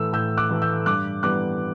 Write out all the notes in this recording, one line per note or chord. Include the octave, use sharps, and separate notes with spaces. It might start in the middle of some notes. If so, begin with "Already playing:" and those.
Already playing: A2 E3 A3 E6
A2 E6 G6
D6 F#6
E3 A3
E6 G6
G2 D6 F#6
E3 G3 B3 D6 F#6